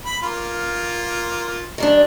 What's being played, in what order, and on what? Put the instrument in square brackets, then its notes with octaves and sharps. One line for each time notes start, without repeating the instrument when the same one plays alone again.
[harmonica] B5
A#3 F4
[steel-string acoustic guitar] D#3 G3 D4